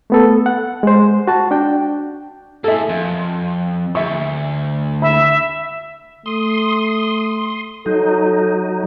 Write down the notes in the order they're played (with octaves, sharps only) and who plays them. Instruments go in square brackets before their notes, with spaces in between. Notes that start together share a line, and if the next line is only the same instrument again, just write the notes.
[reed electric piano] A3 B3 A4
F#5
G#3 C5
F#4 A5
D4 G5
[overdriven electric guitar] A#3 G#4 [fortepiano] A4 E5
[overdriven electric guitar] F2
[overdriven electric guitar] D2 [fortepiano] E5 C#6
[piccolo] E5 [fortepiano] B5
[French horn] A3 [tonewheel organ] C6 D#6
[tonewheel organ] F#3 D#4 [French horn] A4